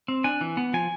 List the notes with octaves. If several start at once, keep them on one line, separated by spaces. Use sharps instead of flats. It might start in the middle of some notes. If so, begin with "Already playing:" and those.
C4
D4 G#5
E3
B3
F3 G#5